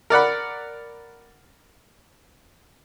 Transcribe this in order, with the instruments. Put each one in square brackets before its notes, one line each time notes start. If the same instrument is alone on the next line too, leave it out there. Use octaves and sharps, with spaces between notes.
[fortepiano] A#4 D5 F#5 B5